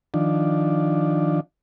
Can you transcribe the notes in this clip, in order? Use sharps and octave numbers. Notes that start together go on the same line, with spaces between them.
D#3 F3 D4